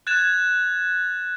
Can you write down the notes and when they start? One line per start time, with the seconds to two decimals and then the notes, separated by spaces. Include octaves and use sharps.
0.07 F#6 G#6 A6 E7 F7